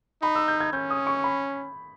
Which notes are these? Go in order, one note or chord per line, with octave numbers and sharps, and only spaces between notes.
D#4 B5
E6
G6
G#6
C#4 G6
D#6
C#6
B5